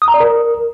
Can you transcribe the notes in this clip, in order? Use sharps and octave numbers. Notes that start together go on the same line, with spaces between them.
D#6
A#5
D5
A#4